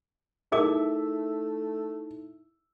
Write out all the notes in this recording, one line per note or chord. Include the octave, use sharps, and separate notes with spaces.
A3 D#4 E4 G#4 A#4 E5 D6